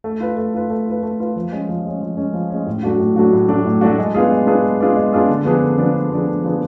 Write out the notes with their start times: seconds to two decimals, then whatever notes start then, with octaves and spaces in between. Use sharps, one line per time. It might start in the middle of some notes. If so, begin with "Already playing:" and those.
0.04 A3
0.20 F4 B4
0.37 A3
0.54 F4 B4
0.70 A3
0.86 F4 B4
1.03 A3
1.20 F4 B4
1.36 F3
1.52 G#3 C#4
1.69 F3
1.85 G#3 C#4
2.01 F3
2.17 G#3 C#4
2.34 F3
2.50 G#3 C#4
2.66 A2
2.83 F#3 A3 D4 F#4
3.00 A2
3.16 F#3 A3 D4 F#4
3.33 A2
3.49 F#3 A3 D4 F#4
3.65 A2
3.81 F#3 A3 D4 F#4
3.98 G#3
4.15 B3 D4 F4 G#4
4.31 G#3
4.47 B3 D4 F4 G#4
4.63 G#3
4.80 B3 D4 F4 G#4
4.96 G#3
5.13 B3 D4 F4 G#4
5.29 D3
5.45 F3 B3 D4 G#4
5.62 D3
5.78 F3 B3 D4 G#4
5.94 D3
6.11 F3 B3 D4 G#4
6.27 D3
6.44 F3 B3 D4 G#4